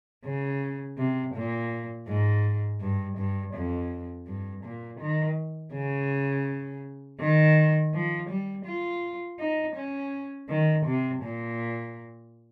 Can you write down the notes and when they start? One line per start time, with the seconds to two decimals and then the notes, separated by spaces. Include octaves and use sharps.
0.25 C#3
0.98 C3
1.34 A#2
2.07 G#2
2.80 G2
3.18 G2
3.54 F2
4.27 G2
4.64 A#2
5.00 D#3
5.73 C#3
7.20 D#3
7.93 F3
8.29 G3
8.65 F4
9.39 D#4
9.75 C#4
10.49 D#3
10.86 C3
11.22 A#2